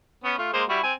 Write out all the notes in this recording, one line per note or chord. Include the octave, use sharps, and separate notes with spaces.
B3 C#4
A3 F4
G#3 A#3 C5
G3 E4 F#4
C4 G#5